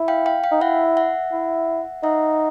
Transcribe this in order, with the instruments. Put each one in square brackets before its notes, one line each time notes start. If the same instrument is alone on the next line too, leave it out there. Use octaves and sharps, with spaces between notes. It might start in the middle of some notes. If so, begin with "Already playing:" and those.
Already playing: [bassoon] E4
[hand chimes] F5 G5
F5 G5
F5 G5
[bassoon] D#4
[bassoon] E4 [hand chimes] E5 F#5
[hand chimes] E5 F#5
[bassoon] E4
[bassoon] D#4 [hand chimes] E5 F#5